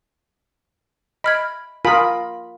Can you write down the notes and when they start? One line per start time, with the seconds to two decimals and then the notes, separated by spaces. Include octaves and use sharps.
1.24 D#5 B5 F6 G#6
1.85 F4 A#4 G#5 B5 D#6